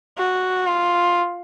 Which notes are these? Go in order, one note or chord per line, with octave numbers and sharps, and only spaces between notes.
F#4
F4